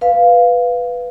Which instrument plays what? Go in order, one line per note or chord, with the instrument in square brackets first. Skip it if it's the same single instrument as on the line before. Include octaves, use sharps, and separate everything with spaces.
[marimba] B4 F5